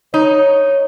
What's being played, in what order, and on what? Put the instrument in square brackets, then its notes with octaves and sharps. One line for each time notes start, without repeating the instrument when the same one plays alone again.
[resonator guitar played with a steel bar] D#4 [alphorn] C#5